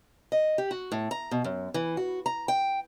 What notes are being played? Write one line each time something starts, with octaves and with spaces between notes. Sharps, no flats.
D#5
G4
F#4
A2
A#5
B2
F#2
E3
F#4
A#5
G5